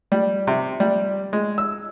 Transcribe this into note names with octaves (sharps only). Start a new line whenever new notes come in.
G3
C3
G3
G#3
E6